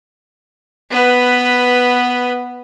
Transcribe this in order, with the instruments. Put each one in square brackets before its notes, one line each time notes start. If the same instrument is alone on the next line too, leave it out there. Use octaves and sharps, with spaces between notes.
[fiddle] B3 B4